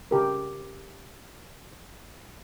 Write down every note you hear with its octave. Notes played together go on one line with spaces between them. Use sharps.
C#3 G4 A#4